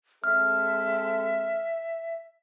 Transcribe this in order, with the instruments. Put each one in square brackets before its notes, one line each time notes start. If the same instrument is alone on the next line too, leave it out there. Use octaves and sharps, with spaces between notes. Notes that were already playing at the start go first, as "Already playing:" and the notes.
[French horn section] G#3 C4 A4 [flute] E5 [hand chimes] F6